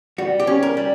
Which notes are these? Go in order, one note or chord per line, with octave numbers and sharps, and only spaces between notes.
G3 F#4
G4
C#4
A#4
G3